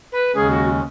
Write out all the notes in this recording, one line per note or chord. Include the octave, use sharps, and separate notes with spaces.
B4
D#2 C#3 G#3 C#4 G#4
F#4